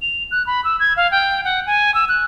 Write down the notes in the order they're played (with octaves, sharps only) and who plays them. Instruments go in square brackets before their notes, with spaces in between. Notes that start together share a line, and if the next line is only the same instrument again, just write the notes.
[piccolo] F7
F#6
B5
E6
G#6
F5
G5
F#5
G#5
E6
F#6